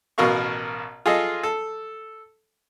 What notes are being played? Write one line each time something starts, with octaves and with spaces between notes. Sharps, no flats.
A1 B2 A#4 F5 C#6
F4 G#4 A4 D#5
A4